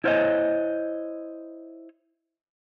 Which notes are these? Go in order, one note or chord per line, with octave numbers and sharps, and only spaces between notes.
E4 C5 C#5 D#5